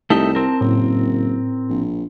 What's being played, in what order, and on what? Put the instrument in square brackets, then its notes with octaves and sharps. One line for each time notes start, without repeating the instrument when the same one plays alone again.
[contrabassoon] C2 [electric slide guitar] A3 D#4 G4 [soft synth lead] A5
[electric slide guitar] C4 A#4
[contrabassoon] F#1 [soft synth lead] A2
[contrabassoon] A#1